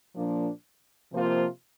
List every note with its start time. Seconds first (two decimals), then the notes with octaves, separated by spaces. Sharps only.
0.15 A#2 F3 A#3 D4
1.11 C3 F3 A#3 F4 C5